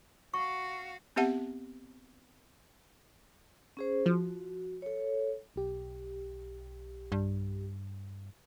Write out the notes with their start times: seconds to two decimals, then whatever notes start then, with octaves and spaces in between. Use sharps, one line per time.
0.34 F#4 F5 C#6
1.16 B3 C4 G4 E5 F#5 A5
3.77 C#4 G#4 C5
4.06 F3 F#4
4.82 A4 C#5
5.56 B1 G4
7.12 G2